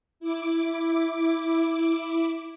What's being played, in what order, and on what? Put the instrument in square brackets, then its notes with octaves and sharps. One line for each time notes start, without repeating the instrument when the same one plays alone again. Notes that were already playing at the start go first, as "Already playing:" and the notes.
[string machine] E4 D6